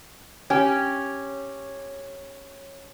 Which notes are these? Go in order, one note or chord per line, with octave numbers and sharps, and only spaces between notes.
C#4 G4